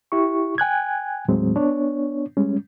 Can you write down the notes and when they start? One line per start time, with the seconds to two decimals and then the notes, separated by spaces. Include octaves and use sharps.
0.12 E4 G4 C#6
0.58 G5 G#5 F#6 G#6
1.28 D#2 A2 F#3 G#3 C4
1.56 B3 D4 C#5
2.37 G3 G#3 C#4